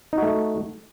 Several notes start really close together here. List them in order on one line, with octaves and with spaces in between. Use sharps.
D#4 F#4 A3